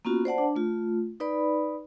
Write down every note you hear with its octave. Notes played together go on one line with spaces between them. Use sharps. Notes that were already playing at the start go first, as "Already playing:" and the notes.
A#3 B3 C#4 F4 F#4
C5 D5 F#5 A5
D4
A3 F4
D#4 B4 D5 B5